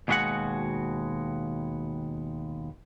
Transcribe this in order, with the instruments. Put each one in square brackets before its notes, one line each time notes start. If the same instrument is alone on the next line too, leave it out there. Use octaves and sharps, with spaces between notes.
[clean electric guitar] D#2 B2 G#3 A#3 F#4 F#5